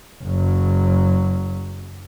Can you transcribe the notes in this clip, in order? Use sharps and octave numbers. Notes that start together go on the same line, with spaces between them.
F#1 F#3